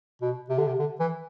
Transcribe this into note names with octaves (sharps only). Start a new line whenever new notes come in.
B2
C3
D3
C3
D3
E3